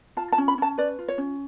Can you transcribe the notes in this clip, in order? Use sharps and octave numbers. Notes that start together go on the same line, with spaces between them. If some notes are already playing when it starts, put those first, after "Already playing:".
F4 A5
A5
C#4
B5
C#4 A5
B4 D5
F4
C#5
C#4